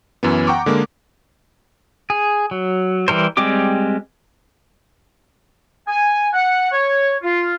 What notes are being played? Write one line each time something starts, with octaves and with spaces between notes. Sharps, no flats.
F#2 E3 B3
F#5 G5 A#5 C#6 D6
D3 G#3 A#3
G#4
F#3
E3 G3 A#4 C5
G3 G#3 C4 G4 D6
G#5
F#5
C#5
F4